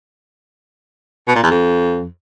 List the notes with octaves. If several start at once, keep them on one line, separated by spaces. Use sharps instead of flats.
B2
A#2
E2
F2